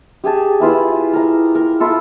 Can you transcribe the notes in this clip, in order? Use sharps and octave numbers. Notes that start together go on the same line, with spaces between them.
G4 G#4 G#5 A5
E4 F4 B4 E5
A#4 A#5
A#4
E4 F4 A4